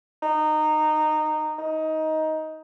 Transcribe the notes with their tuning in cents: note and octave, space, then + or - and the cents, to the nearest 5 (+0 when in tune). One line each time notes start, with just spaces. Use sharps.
D#4 -15
D#4 +15